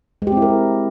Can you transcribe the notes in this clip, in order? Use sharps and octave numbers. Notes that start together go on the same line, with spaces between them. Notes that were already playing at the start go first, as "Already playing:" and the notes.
G#3
G4
C4
E4
A#4